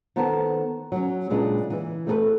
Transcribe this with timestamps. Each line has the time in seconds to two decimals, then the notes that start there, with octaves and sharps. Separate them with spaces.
0.16 D#3 B3 A4 C5 A5
0.92 F#3 C#4
1.30 A#2 C#3 G#3 D4 B4
1.70 E3 E4
2.07 A3 C4 D4 G#4 A4 B4